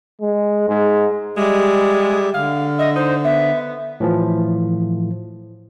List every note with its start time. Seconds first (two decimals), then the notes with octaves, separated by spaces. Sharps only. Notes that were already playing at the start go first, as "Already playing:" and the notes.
0.21 G#3
0.68 G#2
1.37 G3 G#3 G4 E5
2.34 D3 F5
2.79 D#5 E5
2.96 D#4 C5
3.25 B3 E5
4.00 A2 E3 F3